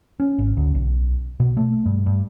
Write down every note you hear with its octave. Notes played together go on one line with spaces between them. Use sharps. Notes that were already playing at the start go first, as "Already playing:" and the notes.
C#4
G#1
D2
B1
B2
A3
G2
G2